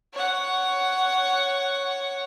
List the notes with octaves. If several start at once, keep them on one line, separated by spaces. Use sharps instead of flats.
C#5 F#5